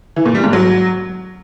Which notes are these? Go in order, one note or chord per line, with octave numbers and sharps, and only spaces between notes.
E3
A#2
G3
G#2
F#3